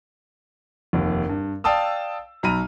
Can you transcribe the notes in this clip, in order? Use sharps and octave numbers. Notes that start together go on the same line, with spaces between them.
F1 D#2
G2
D5 F5 G5 A5 D#6 E6
B1 A#5 B5 F6 D#7